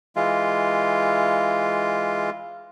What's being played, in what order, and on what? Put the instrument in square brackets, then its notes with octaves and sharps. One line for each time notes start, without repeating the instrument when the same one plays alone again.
[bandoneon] E3 G#3 F4